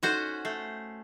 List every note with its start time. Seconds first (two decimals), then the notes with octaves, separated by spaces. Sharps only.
0.03 C#4 D#4 F#4 A4 C5 F#5
0.45 A3 G6 C7